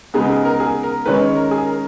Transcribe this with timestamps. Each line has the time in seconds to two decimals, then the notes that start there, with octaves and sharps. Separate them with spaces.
0.14 C#3 G#3 B3 D#4 G#4
0.30 G#4
0.45 A#4
0.60 G#4
0.83 A#4
1.06 D#3 G#3 C#4 B4
1.21 C#5
1.36 A#4
1.51 G#4
1.66 A#4